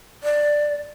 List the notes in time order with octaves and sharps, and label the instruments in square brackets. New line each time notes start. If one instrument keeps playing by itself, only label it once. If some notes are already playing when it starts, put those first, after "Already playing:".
[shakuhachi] D5